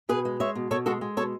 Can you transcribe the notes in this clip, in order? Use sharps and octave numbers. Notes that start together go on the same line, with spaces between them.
B2 G#4 B4
G#3
G#3 C#5 E5
B2
B2 A4 C#5
G#3 F#4 A4
G#3
B2 A4 C#5